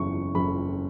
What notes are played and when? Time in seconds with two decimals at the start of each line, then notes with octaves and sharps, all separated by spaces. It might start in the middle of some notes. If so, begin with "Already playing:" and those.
Already playing: F#1 E2 C#6
0.35 F#1 B5